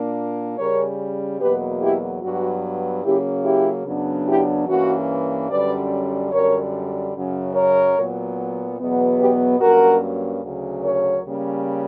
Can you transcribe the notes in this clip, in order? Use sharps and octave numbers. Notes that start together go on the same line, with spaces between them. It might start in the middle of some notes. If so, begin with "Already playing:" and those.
Already playing: A#2 A#3 D4
C#3 G3 C#4 A#4 C#5
E2 B2 F#3 A#3 G4 B4
E4 G4
G2 F#3 B3 F#4
C#3 F#3 A#3 C#4 E4 G4
E4 G4
F#2 C#3 F#3 B3 D4
E4 G4
G2 E3 A#3 C#4 F#4
F#2 D3 G3 C#4 B4 D5
F#2 D3 G3 A#4 C#5
F#2 C#3 F#3 C#4
A#4 C#5
A#2 F#3 B3
E2 B2 F#3 B3
G4 B4
G2 F#3 A#3 C#4 F#4 A#4
D2 C#3 F#3
A#4 C#5
C#3 G3 A#3 C#4